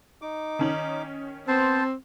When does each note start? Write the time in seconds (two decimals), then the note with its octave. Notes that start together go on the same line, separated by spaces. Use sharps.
0.22 D#4 D6
0.59 D#3 C#4 F#7
1.48 B3 C4 C5 A5